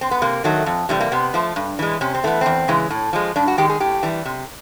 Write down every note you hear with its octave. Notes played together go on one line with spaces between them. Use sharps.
C4
B3
C3 A#3
D#3 F#3 A3
F2
C3 E3 G3 A3
A#3
C3 B3
F3 A3
G2
E3 G#3
C3 C#4
C4
E3 A3 B3
E2 C4
C#3 E3 G#3
A2
F3 G#3
G2 D4
F#4
D#3 G#3 G4
G#4
A2 G4
E3 G3
C3